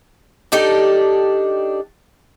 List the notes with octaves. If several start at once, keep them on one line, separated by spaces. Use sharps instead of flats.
D4 D#4 G4 A4